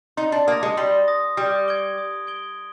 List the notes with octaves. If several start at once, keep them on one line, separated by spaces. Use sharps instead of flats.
D#4 C6
D4
A#3 D#6 A#6
G#3
G3 C6
D#6 A#6
G3 D#6
G#6 D7 G7
D#6
G#6 D7 G7